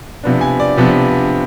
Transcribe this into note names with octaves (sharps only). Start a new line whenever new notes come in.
C3 F3 B3 D4
G#5
D5
C3 F3 B3 D4